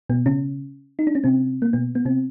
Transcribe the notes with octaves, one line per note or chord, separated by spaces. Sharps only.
B2 B3
C#3 C#4
D#4
D4
C#4
C3 C4
A#3
B2 B3
B3
C3 C4